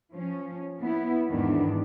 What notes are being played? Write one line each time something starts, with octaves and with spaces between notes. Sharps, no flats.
F3 C#4
B3 E4
E2 G#2 D#3 B3 D4